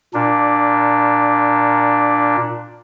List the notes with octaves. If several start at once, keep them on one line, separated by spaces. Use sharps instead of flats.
A#2 D4